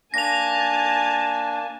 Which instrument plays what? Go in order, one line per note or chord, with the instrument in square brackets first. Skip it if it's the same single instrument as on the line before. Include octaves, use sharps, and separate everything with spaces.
[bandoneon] A#3 D4 [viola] G#5 A5 [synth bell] A#6 F7